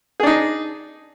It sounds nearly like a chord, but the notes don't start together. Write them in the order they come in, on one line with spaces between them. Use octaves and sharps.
G#4 D4 D#4